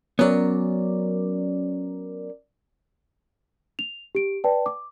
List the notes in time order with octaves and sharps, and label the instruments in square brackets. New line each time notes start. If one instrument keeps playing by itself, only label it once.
[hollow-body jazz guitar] F#3 B3 [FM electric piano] C#4 A#4 D5
[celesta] F7
G4 D7
B4 D5 G5 A5
D6